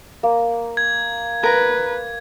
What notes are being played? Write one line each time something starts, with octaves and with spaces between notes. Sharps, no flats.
A#3
G#6
A#4 B4 A#5